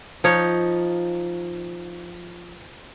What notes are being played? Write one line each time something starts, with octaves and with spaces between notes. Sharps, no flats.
F3 D#4 C#5